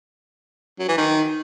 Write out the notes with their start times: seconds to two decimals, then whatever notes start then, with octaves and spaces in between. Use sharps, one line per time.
0.79 F#3
0.88 E3
0.98 D#3